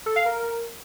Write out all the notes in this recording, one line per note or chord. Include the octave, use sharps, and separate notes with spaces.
A4
F5
A#4